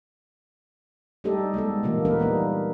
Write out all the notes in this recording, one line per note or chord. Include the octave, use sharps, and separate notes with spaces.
G3 A3 D#4 G4 A4 D#5
G#3 A3 B3 A4
A#2 D3 E3 A3 A#3
B3 D4 D#4 A#4 B4
G3 A#3 D#4